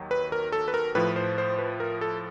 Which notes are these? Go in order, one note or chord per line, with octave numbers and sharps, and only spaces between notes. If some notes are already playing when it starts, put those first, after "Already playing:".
Already playing: D#2 D#3 F#3
B4
A#4
A4
B4
A#4
A2 F3 B4
C5
C5
B4
A#4
A4